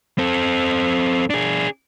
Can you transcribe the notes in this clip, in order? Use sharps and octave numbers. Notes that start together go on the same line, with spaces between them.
C4 A4
D4 G#4